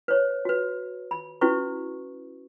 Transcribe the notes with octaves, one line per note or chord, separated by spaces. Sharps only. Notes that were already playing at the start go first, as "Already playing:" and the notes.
B4 C#5
F#4 B4
B5
C#4 E4 F#4 B4 C#6